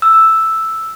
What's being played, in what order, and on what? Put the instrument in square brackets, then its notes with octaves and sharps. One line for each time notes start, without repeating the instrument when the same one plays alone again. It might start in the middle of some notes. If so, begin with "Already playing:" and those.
[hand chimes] E6